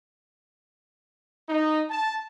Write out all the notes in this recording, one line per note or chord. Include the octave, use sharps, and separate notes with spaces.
D#4
A5